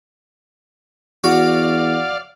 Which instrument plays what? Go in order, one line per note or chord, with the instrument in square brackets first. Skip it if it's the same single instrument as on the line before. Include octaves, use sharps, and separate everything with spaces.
[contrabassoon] E2 [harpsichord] F#4 [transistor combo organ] D5 F5